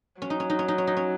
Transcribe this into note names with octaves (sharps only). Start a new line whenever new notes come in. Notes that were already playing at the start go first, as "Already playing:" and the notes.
F#3 C#4
D#4
C#4
D#4
C#4
D#4
C#4
D#4
C#4